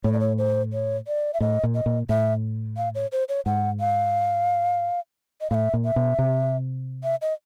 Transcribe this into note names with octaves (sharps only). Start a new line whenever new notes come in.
A2 C#5
D5
C#5
C5
C#5
D5
E5
A2 D#5
A#2
D#5
A#2
A2 E5
F5
C#5
C5
C#5
G#2 F#5
F5
D#5
A2 E5 F5
A#2
E5
B2
C3
E5
D#5